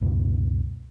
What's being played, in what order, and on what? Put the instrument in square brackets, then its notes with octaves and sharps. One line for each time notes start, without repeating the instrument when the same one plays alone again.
[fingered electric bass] C#2 F#2 B2 B3